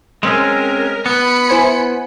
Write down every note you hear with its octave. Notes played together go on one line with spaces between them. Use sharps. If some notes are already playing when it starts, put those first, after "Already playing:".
G#3 C4 C#4 A#4
B3 B5 C#7
E4 C5 G#5